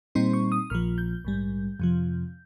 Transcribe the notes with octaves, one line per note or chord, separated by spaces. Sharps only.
A#2 G3 C4 D#4 C6
C#6
D#6
A#1 A#2 F3 F6
G6
A#1 G#2 G3
F2 C3 F3